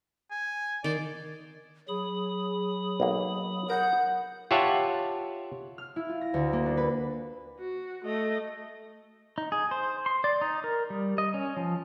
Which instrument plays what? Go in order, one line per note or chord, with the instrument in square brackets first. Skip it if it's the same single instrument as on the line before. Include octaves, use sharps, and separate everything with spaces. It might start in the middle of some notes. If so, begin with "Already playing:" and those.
[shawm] G#5
[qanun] D#3 C6 [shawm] D5
[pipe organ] F#3 B5 D#6 [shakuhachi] G#4
[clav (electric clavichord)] B1 A#3
[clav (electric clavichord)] A#4 [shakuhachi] F#5 [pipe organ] D#6 G6
[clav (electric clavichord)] F4 G4 C#5 E5 F#5 A5
[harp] F6
E4
F4
A#6
D2
A#3
D4
B4
[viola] F#4
A3 D#5
[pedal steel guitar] D#4
G#4
C5
C6
D5
D#4
A#4
G3
D#5
C#4
F3